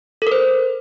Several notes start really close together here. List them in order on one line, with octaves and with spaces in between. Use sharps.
A4 A#4 C5